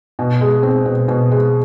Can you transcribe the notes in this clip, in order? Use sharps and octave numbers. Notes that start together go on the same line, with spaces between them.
B2
G#3
C4
B2
B2
G#3